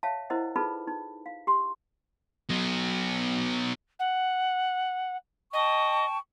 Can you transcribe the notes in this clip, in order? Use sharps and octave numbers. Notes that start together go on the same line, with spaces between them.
C#5 E5 F5 A5
E4 A#4 C5 D#5 F#5
D#4 F4 G#4 A4 B4 B5
D#4
F5
G4 C6
F#3 B3
F#5
D#5 G5 A5 C#6